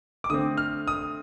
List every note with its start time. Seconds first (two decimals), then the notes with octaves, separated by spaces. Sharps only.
0.24 D6
0.30 D3 A3 C4 D#6
0.57 F6
0.88 D#6